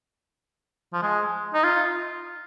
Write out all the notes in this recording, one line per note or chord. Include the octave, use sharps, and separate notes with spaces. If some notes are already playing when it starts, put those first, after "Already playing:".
F3
G#3
D#4
F4